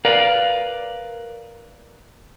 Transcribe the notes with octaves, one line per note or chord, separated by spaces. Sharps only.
A#4 B4 D5 F5